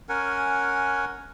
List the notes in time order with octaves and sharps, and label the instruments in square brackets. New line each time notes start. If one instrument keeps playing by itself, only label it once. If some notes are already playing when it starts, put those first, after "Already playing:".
[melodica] C#4 A#4 F#5 G#5